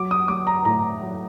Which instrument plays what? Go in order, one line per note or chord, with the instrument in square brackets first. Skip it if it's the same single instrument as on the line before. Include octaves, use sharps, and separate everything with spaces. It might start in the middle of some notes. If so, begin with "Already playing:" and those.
Already playing: [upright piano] F#3 D6
D#6
F#3 D6
A#5
A2 A#5
F#3